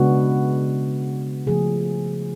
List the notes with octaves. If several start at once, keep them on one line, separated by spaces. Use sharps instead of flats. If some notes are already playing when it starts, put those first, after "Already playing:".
Already playing: C#3 G#3 B3 D4 F#4
C#3 F3 A3 G#4